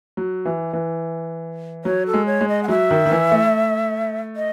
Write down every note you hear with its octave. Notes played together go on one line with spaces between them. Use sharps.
F#3
E3
E3
F#3 C#5
A4
G#3
C#5
G#3
D#5
F#5
F#3 E5
D#3
D#3
E3
A3
D#5